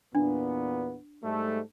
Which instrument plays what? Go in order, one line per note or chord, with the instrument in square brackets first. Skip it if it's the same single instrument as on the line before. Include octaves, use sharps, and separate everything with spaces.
[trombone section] E2 A#2 B3 [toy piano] D4
[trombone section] G#2 G3 A3